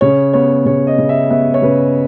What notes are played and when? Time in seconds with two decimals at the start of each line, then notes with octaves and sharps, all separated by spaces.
0.01 C#3 C#5
0.33 B3 C#5
0.66 C#3 C#5
0.87 D#5
0.98 C#3
1.09 E5
1.30 B3 E5
1.54 C#5
1.62 C#3 B4